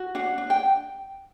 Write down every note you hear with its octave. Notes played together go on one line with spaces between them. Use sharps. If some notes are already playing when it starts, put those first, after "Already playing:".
Already playing: F#4
D4 F#5
D4
G5